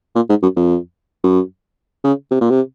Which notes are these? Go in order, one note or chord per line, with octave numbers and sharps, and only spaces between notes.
A#2
G#2
F#2
F2
F#2
C#3
C3
A#2
C3